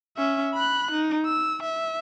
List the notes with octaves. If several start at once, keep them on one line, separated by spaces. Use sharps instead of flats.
C#4 E5
B5 F#6
D#4
E6
E5